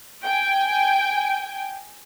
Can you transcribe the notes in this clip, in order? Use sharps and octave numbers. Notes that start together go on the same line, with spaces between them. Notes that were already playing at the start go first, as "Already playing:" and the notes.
G5 G#5